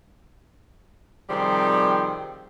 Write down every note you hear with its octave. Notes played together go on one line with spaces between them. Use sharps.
C3 D#3 F3 G3 C4 G#4